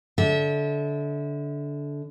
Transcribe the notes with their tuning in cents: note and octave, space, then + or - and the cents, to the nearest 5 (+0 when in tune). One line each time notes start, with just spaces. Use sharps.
D3 -20 E5 -35